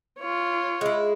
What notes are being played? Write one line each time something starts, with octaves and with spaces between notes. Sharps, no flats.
F4 C#5
G#3 E4